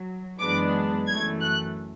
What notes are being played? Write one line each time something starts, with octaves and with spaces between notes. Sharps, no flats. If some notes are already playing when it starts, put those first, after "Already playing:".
Already playing: F#3
F#2 E3 G#3 B3 D4 D6
F#2 E3 A3 G#6
F#6